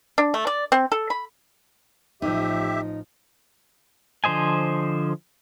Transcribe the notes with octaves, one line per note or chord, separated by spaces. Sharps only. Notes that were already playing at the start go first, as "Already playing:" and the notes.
D4
A3
D5
C4
A4
B5
A1 F3 D#4 G4 E5
D3 F3 C5 D#5 G#5